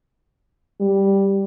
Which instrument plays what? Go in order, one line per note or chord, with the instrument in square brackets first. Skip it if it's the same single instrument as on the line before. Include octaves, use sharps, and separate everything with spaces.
[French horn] G3